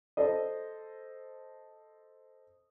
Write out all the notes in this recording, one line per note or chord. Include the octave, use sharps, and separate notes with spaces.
A4 C5 D#5